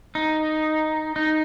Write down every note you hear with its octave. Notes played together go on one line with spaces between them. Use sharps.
D#4
D#4